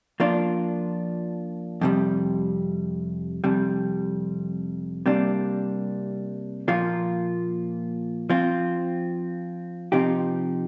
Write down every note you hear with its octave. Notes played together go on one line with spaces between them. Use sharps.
F3 A#3 D4 F4
F2 C3 G3
F2 C3 G3
C3 G3 A#3 D4
A#2 F3 A#3 F4
F3 C4 F4
C3 F3 C4 D#4 G4